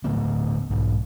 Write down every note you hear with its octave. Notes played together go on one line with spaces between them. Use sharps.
A2 D3 A3 B3
B1 G#2